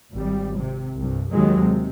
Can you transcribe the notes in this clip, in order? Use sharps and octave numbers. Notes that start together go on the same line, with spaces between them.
G#1 G3
C3
C2 G2
D#2 D#3 F#3 G#3
C3